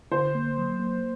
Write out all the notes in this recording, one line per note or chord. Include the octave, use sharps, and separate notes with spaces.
D3 C5
A#3
F#3
A#3